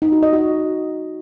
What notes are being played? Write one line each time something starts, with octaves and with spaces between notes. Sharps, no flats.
D#4
F#4
D#5
F#4